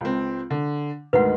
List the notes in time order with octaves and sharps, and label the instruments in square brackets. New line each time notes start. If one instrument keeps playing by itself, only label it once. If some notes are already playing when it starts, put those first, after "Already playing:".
[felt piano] C#2 C4
D3
[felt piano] D2 G#2 D#3 [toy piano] B4 F#5